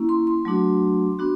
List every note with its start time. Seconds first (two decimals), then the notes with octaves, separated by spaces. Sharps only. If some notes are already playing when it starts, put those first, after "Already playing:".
Already playing: A#3 C#4 E4
0.09 C6
0.27 C6
0.45 F#3 A3 D4 F#4
1.19 B3 D4 F#4